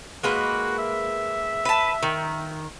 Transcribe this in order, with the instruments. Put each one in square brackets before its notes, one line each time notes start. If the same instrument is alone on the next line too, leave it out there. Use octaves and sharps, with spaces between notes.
[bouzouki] G#3 A#3 B4 [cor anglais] F#4
[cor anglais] E5
[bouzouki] B4 A5
D#3